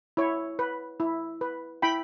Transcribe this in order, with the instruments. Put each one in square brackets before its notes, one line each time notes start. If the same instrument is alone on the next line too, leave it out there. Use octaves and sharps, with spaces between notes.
[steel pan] E4 C#5
B4
E4
B4
E4 G5 B5